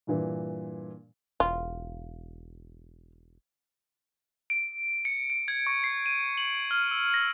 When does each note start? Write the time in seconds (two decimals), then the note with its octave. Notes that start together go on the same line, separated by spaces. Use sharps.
0.07 G2 A#2 E3
1.40 E1 F4
4.50 D7
5.05 C#7
5.30 D7
5.48 G#6
5.67 C#6
5.84 C7
6.06 D#7
6.38 F#7
6.71 F6
6.91 E6
7.14 A#6